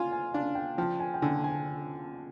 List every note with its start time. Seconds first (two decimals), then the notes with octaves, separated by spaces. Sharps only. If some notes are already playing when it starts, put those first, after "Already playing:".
Already playing: F4 G#5
0.12 G#5
0.34 D4 F5
0.55 G5
0.78 F3 G5
1.00 G#5
1.14 G5
1.22 D3 G#5
1.44 G#5